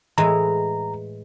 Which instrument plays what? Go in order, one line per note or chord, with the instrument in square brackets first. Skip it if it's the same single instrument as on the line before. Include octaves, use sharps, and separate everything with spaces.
[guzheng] A2 E3 G#3 [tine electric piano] A#5